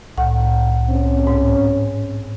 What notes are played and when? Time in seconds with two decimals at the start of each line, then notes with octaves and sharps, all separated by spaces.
0.18 C2 A2 F#5
0.89 C4 C#4
1.27 G#2